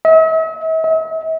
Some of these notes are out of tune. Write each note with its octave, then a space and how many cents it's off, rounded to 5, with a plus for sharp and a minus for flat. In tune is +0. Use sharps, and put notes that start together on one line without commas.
E5 -45
E5 -45